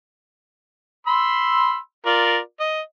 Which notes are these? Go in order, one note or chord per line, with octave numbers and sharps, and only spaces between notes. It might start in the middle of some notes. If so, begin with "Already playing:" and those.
B5 C6 E6
F4 A#4 D5
D#5